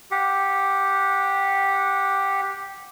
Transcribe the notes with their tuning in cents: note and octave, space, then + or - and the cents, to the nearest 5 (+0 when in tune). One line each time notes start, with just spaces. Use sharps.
G4 +0 F#5 -20